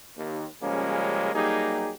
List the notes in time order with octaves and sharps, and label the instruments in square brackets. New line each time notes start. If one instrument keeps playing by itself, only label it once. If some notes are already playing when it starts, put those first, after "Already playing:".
[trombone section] D#2
C#3 F3 G3 G#3 A#3 C#4
F#3 G3 A#3 D#4 G4 G#4